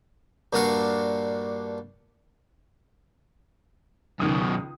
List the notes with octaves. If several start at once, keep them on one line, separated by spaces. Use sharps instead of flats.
G2 A#2 D4 F#4 F5 C#6
C#2 F#2 B2 D#3 D#6